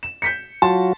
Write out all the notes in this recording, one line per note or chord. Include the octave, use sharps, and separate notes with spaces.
E7
G6 B6 C#7
F#3 F4 F#4 A5 C6